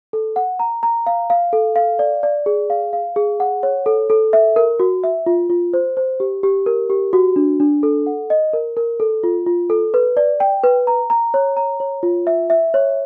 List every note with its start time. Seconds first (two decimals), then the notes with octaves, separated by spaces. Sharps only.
0.13 A4
0.36 F#5
0.59 A#5
0.83 A#5
1.07 F5
1.30 F5
1.53 A4
1.76 F5
1.99 D5
2.23 D5
2.46 G#4
2.70 F5
2.93 F5
3.16 G#4
3.40 F#5
3.63 C#5
3.86 A4
4.10 A4
4.33 E5
4.56 A#4
4.80 F#4
5.04 E5
5.26 F4
5.50 F4
5.73 C5
5.97 C5
6.20 G4
6.43 G4
6.66 A#4
6.90 G4
7.13 F#4
7.36 D4
7.60 D4
7.83 A4
8.06 F#5
8.30 D#5
8.53 A#4
8.77 A#4
9.00 A4
9.24 F4
9.46 F4
9.70 A4
9.94 B4
10.17 D5
10.40 G5
10.64 B4
10.87 A#5
11.10 A#5
11.34 C#5
11.57 A#5
11.80 C#5
12.03 F4
12.27 E5
12.50 E5
12.74 C#5